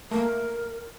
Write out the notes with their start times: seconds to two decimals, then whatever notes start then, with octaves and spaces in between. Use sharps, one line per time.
0.11 A3 A#3 A#4